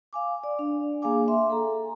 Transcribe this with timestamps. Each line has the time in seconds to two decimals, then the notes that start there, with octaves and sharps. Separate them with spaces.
0.13 F5 G#5 D6
0.44 D5
0.59 D4
1.02 A#3 G#4 F5 G#5 D6
1.28 E5 C6
1.50 A4 A#5